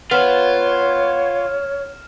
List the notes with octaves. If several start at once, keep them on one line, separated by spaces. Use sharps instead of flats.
B3 F4 C#5 F6 E7